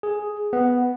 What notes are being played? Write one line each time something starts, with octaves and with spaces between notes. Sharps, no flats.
G#4
B3